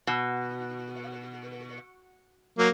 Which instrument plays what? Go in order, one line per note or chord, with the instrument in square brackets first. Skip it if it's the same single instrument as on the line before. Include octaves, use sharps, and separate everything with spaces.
[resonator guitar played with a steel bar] B2
[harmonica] F#3 A#3